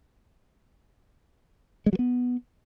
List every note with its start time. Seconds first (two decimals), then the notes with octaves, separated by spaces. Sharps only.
1.86 G#3
1.93 F#3
1.99 B3